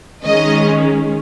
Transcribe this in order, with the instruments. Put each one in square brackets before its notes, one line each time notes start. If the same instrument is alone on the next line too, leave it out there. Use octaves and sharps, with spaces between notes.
[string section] D#3 G#3 C#4 D#5